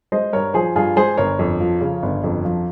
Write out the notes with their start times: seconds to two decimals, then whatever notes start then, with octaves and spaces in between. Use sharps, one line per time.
0.12 G#3 C5 D#5
0.33 G2 A#4 C#5
0.54 F3 G#4 C5
0.75 G2 F4 G#4
0.96 G#3 G#4 C5
1.18 G1 A#4 C#5
1.39 F2
1.60 F3
1.81 C#3
2.03 G1
2.24 F2
2.45 F3